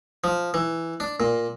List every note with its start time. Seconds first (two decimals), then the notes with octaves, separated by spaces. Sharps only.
0.24 F3
0.54 E3
1.00 D4
1.20 A#2